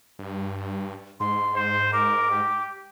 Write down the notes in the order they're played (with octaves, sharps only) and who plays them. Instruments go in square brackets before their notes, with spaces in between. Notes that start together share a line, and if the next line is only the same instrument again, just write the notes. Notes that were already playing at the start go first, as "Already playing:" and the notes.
[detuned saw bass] G2
[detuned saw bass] G#2 [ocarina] C6
[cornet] C5
[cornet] A#4 [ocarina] D6
[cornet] G4